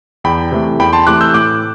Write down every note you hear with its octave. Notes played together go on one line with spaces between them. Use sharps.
E2 G5 B5
C3 E3 A3
E2 G5 B5
A5 C6
C3 E3 A3 D6 F#6
E6 G6
A2 D6 F#6